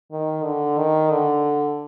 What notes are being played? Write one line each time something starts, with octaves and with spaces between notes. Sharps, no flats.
D#3
D3
D#3
D3